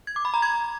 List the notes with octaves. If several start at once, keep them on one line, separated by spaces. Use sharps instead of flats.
G#6
D6
B5
A#5
G#6